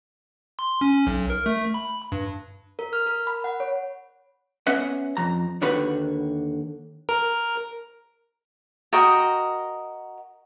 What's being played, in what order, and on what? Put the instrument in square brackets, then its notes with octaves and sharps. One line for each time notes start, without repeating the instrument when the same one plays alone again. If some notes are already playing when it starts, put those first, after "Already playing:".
[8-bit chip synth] C6
C#4
B1
A#4
A3
B5
G2
[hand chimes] A#4
F6
A#4
B5
F#5
C#5
[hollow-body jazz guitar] B3 C#4 B4 E5 F#5
F2 A#5
D#2 D3 D#3 F#4 B4 B5
[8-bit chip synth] A#4
[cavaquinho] F#4 A#4 D#5 G5